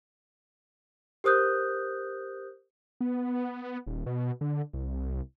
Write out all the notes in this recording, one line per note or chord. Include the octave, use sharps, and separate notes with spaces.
G4 A#4 C5 D#6 F#6 G6
B3
D#1
B2
D3
C2